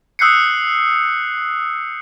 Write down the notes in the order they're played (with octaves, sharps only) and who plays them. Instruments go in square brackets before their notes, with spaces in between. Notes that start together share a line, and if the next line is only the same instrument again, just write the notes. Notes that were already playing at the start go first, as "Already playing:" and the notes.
[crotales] D#6 E6 F#6 G6 C7 C#7